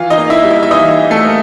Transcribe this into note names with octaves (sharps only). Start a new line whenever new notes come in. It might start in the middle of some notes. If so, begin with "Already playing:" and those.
Already playing: E3 F4 F5
D#4 D#5
A#3
E4 E5
G3
E4 E5
E5
E3 D#4 D#5
E3
A3 A4
A#3